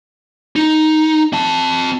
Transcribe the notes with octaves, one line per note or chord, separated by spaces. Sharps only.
D#4
C4 A5